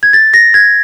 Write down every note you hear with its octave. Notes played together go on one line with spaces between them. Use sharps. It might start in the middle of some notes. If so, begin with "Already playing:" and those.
G#6
A6
A#6
G#6